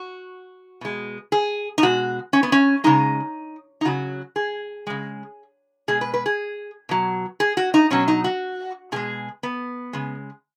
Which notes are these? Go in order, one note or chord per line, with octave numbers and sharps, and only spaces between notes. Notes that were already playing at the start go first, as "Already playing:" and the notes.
Already playing: F#4
B2 G#3
G#4
D#4
B2 G#3 F#4
C#4
B3
C#4
C#3 G#3 D#4
D#4
C#3 F#3 F#4
G#4
C#3 G#3
B2 G#3 G#4
B4
B4
G#4
B2 F#3
G#4
F#4
D#4
B2 F#3 C#4
D#4
F#4
B2 G#3 G#4
B3
C#3 G#3